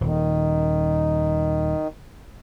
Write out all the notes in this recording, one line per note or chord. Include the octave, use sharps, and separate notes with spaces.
D#1 D#3